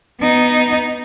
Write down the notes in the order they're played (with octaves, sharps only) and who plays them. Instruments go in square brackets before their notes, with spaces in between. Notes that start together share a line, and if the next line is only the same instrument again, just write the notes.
[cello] B3 D#4